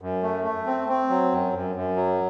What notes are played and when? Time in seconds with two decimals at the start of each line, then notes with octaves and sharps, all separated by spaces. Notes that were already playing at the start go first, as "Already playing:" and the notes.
0.02 F#2
0.23 A3
0.44 A3
0.66 C4
0.89 C4
1.10 F#3
1.32 F#2
1.53 F#2
1.75 F#2
1.96 F#3